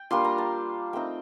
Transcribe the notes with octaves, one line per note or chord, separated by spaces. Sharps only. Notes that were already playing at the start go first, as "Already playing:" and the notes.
Already playing: G5
G3 A#3 D4 F4 C6
A#5
A5
A3 C4 D#4 G5